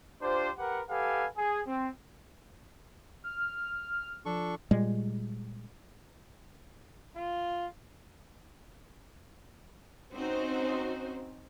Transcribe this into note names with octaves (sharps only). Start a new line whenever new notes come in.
D4 F4 G4 C5
G4 A#4 B4 F#5
G4 A4 B4 F5 F#5 G#5
G#4
C4
F6
F3 D4 A4 C#6
A#2 G3 G#3
F4
C4 C#4 D#4 F#4 C5